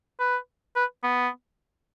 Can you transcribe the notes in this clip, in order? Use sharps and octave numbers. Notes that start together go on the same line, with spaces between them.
B4
B4
B3